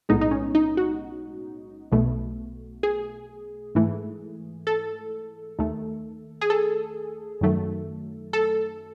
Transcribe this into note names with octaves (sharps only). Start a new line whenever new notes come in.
B1 A2 G#3 B3 D#4
D#4
C#4
D#4
F#4
B1 B2 A3
G#4
G#2 E3 A3
A4
D#2 D#3 A3
G#4
A4
F#2 D#3 F#3 A3
A4